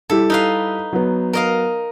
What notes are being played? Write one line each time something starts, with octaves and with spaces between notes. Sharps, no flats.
G3 E4 G4 A4
D#4 B4 F5
F#3 B3
A#4 D#5 F5